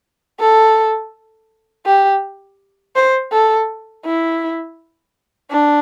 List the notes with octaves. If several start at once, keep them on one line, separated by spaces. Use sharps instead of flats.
A4
G4
C5
A4
E4
D4